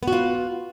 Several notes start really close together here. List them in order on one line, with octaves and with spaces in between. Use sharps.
B3 F#4 F4